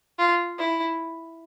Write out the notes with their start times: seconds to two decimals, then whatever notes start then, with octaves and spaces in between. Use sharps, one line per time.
0.19 F4
0.58 E4